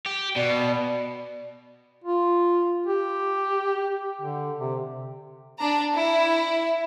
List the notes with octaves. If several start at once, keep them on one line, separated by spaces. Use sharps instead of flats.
G4
B2 D5
F4
G4
D3
C3
D4 A#5
E4